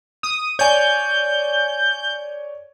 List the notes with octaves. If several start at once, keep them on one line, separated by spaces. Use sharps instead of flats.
D#6
C#5 D5 G#5 G6